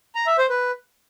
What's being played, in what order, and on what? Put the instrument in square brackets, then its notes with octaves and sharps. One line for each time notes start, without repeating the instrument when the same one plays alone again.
[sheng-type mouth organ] A#5
E5
C5
B4